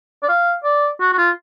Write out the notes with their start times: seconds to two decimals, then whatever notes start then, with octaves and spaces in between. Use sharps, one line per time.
0.23 D5
0.29 F5
0.64 D5
1.00 F#4
1.12 F#4
1.18 F4